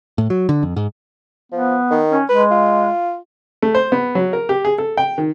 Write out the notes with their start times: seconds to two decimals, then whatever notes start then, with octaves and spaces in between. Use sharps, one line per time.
0.18 A2
0.30 F#3
0.49 D3
0.63 F2
0.76 G#2
1.52 F3 B3
1.91 D#3
2.11 C#4
2.29 G#3 B4
2.51 F4
3.62 A3
3.75 C5
3.92 B3
4.15 F#3
4.33 A#4
4.49 G4
4.65 G#4
4.78 A4
4.97 G5
5.18 D#3